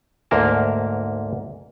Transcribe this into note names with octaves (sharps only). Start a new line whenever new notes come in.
D2 G#2 A#3 A#4 A5